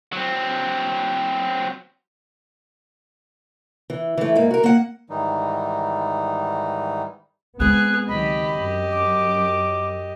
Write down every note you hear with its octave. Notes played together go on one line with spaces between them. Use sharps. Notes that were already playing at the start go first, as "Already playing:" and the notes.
F#3 C4
E3
E3 A3
G#2 A#3
F#4 A#4
A#3 F#5
G#2 D#3 E3 G3 D#4
G#3 B3 C4 G#4 F#6
C#2 D#3 F#3 G4 D#5 B5
F#2
D6